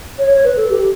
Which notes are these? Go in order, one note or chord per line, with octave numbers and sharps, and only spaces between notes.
C#5
C#5
B4
A4
G4